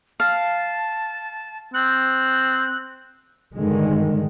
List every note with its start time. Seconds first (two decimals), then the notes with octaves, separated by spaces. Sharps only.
0.20 F5 A5
1.74 C4 F#6
3.56 G2 D3 D#3 G#3